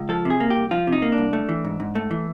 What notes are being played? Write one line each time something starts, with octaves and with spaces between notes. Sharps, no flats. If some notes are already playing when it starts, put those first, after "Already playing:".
Already playing: C#2
F3 A4
C3 G#4
A#3
G4
C2
F3 F4
C3
D#4
A#3
D4
C2
A3
E3
G#2
G#2
A3
E3